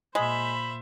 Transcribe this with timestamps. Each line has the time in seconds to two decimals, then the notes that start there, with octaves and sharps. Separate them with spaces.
0.15 A#2 G#3 C5 E5 B5